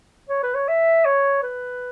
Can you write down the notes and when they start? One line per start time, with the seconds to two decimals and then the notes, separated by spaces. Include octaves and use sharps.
0.29 C#5
0.43 B4
0.54 C#5
0.68 E5
1.05 C#5
1.43 B4